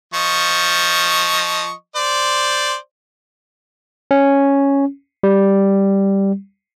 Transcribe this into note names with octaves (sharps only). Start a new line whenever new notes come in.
F3 D#5 C#6
C5 D5
C#4
G3